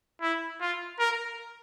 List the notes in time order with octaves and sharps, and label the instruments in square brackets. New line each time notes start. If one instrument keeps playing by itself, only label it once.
[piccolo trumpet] E4
F4
A#4